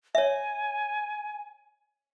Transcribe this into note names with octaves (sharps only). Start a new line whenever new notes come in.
C#5 E5 G#5